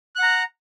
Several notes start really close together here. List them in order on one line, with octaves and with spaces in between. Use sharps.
F#6 F#5 A#5